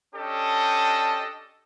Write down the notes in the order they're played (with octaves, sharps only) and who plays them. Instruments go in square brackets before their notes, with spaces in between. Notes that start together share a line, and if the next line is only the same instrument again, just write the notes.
[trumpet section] C#4 D4 G4 A4 D#5 A5